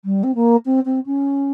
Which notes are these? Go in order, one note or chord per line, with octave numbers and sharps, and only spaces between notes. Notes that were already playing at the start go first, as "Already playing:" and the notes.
G3
C4
A#3
C4
C4
C#4